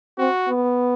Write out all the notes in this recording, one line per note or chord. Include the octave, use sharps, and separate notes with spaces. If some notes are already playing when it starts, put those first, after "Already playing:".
C4 F#4
B3